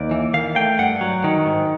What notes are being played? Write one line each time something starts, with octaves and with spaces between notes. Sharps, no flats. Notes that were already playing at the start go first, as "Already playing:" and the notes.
Already playing: D#2 D5
E3
D#3 F5
A3 G5
G2 F#5
F#3
D#3
G#2